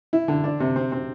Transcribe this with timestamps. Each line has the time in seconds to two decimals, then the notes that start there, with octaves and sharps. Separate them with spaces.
0.13 E4
0.28 D3
0.44 D4
0.60 C3
0.76 C4
0.92 C4